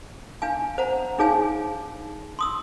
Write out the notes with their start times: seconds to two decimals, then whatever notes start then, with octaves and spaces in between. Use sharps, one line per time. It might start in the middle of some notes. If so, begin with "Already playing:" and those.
0.42 D4 F5 G#5
0.78 C5 F#5 A#5
1.18 D4 D#4 G#4 C#5 F5 G#5
2.39 C6 D#6 E6